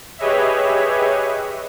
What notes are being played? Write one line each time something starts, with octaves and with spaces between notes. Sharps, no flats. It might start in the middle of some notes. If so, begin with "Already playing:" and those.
G4 G#4 B4 C#5 D#5 E5